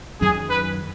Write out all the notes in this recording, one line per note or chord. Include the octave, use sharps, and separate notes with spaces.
F#2 D#3 F#3 C#4 G#4
B4